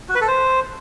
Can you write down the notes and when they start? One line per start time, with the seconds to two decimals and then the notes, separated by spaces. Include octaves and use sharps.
0.09 F#4
0.15 B4
0.21 A4
0.27 C5